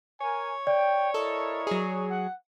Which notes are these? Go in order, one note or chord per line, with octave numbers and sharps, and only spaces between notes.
A#4 C#5 G#5
D5 G5
E4 A4 A#4 D#5
F#3 G#4
F#5